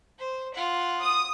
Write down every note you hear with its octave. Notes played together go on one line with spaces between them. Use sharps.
C5
F4 F#5
D#6